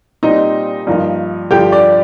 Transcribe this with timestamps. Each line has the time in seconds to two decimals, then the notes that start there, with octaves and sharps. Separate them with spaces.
0.23 A#2 G3 C4 D#4 D#5
0.87 G2 F3 A#3 D#4
1.51 G2 D3 F3 G4 G5
1.72 D4 D5